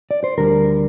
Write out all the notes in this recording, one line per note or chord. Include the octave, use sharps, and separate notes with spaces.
D5
C5
D2 D3 G3 A#4